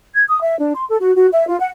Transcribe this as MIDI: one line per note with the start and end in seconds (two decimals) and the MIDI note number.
0.14 0.23 92
0.28 0.40 87
0.43 0.56 76
0.58 0.73 62
0.74 0.85 84
0.88 0.96 69
1.01 1.13 66
1.16 1.27 66
1.32 1.47 76
1.47 1.58 65
1.60 1.69 78